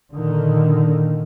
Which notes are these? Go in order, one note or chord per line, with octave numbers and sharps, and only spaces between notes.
A#2 D3 D#3